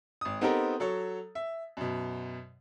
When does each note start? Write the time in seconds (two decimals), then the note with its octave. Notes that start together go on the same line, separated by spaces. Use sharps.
0.21 G#1 D#6
0.41 B3 C4 D#4 G4 A4 A#4
0.80 F#3 A4 C#5
1.35 E5
1.77 F#2 B2